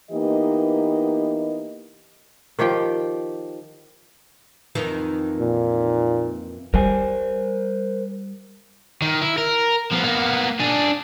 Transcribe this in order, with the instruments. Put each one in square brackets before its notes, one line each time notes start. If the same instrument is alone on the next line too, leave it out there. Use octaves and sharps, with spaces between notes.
[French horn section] E3 A#3 B3 D#4 G4 D#5
[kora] D#3 F3 G4 G5
[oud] F2 D#3 E3
[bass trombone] A#2
[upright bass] G3 [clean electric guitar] A#4 C5 G#5
[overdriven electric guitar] D#3
E4
A#4
F3 B3
A#3 B3
D4 G#4